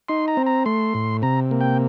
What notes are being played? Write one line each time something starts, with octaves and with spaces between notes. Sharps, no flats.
D#4 C6
A#5
C4
A#5
A3 C6
A2
C3 A#5
A#3
G5